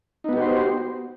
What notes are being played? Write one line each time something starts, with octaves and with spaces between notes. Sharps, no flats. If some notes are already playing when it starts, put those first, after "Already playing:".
B3 D#4 F#4 G4 C5